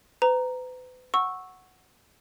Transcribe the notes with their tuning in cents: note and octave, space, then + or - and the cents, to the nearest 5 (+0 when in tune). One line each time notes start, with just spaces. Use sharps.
B4 +40 A#5 +0
F#5 +0 C#6 -10 E6 -5